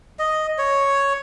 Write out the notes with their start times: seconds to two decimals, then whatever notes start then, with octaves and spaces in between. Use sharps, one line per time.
0.19 D#5
0.58 C#5